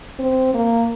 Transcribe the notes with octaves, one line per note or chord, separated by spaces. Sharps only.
C4
A#3